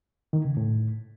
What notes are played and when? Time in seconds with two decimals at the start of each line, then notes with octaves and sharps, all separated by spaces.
0.33 D#3
0.45 C#3
0.57 A2